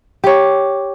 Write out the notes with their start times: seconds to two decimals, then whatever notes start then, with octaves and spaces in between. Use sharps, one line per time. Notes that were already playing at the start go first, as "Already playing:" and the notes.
0.24 G4 C#5